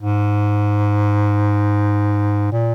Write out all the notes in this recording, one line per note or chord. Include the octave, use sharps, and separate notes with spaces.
G#2
A#2